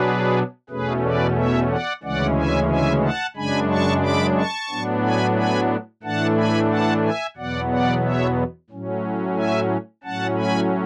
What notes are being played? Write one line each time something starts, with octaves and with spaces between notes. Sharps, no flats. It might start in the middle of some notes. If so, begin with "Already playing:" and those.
Already playing: B2 F#3 B3 D4 G#4 B4
E2 B2 A3 C#4 G#4 B4
B4 D5
C#5 E5
D5 F#5
D2 C#3 E3 G#3 C#4 D5 F#5
E5 G#5
E5 G#5
F#5 A5
F#2 C#3 G#3 D4 G#5 B5
A5 C#6
B5 D6
A5 C#6
A2 F#3 B3 D4
G#5 B5
G#5 B5
A2 E3 A3 D4 F#5 A5
G#5 B5
F#5 A5
E5 G#5
E2 B2 F#3 B3 D5 F#5
D5 F#5
C#5 E5
A2 F#3 C#4
E5 G#5
A2 F#3 C#4 F#5 A5
G#5 B5